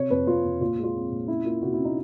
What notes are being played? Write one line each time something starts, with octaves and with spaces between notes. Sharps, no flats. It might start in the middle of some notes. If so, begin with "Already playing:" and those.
Already playing: C3 C#5
F2 B4
F2 F4
F2
A#2 F4
G#3
F4
C4
A#2
C#4 E4
A#3 F4
C3 F#4
E4
C#4
D#4